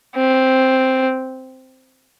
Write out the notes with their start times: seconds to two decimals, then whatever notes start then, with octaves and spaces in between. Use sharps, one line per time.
0.16 C4